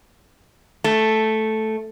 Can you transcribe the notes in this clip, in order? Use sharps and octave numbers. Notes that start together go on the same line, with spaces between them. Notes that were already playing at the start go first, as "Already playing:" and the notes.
A3